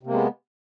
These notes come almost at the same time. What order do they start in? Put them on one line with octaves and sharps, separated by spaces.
C3 A#3 G#3 B3